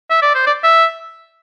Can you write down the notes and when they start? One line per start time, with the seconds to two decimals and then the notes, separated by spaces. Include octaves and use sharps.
0.10 E5
0.22 D5
0.35 C5
0.47 D5
0.64 E5